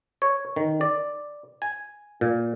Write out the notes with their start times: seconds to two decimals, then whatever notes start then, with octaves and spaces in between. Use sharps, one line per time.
0.22 C#5
0.56 D#3
0.81 D5
1.62 G#5
2.21 A#2